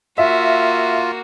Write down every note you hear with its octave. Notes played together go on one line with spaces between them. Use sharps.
A#3 F4 F#4 E5 F5